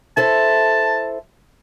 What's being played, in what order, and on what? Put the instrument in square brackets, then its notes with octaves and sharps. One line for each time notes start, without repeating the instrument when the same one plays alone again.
[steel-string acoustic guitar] E4 A4 C5 [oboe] A5